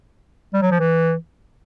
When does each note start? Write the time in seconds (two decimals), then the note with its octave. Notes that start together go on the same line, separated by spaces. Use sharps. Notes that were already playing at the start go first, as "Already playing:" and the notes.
0.54 G3
0.62 F#3
0.71 F3
0.80 E3